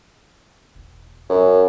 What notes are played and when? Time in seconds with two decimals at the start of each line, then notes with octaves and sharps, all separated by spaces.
0.76 E1
1.29 F#2